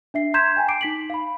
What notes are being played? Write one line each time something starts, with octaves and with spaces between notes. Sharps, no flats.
D4 E5 C7
A#5 C6 G6 G#6 B6 E7
G5 G#5 A#5
D6 C7 D7
D#4 B6 F#7
F5 B5